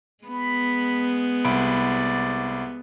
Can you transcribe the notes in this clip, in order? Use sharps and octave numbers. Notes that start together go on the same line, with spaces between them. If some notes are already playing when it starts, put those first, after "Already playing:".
G#3 B3 B5
C2 D5 B5 D7